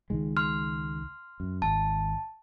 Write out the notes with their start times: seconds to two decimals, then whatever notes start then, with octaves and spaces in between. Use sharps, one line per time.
0.10 C#2 D#3 G#3
0.37 C6 F6
1.40 F#2
1.62 G#1 A5